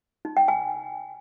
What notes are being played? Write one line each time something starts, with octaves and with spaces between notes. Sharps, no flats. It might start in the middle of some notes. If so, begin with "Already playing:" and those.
D#4
G5
G#5